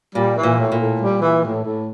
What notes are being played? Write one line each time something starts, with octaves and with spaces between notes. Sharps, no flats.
A#2 G3
E3
A#2
A2
A#2
A2
G3
E3
A2
A2